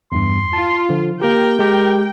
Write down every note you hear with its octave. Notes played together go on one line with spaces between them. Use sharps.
E2 G2 C6
F4 A5
D3 F3
A#3 G4 A#4 G5
G#3 G4 A#4